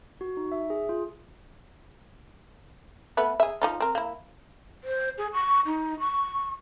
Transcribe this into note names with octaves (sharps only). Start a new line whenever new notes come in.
F#4
D#4
E5
G#4
F4
A3 B3 B4
G#4 E5
F3 D#4 F4
C4 A#4
A#3 E4
C5
G#4
C#6
D#4
C#6